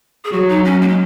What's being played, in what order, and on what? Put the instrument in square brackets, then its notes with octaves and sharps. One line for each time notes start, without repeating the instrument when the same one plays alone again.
[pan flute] G#4
[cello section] F#3 [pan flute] F#4
[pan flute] D#4
C#4
A#3
G#3